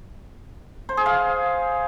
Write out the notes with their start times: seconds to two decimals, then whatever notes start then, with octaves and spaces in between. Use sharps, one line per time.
0.89 C5
0.97 G#4
1.06 F5